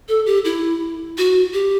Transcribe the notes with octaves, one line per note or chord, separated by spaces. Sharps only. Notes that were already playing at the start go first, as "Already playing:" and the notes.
A4
G4
E4
F#4
G4